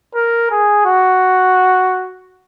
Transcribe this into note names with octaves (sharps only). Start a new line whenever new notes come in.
A#4
G#4
F#4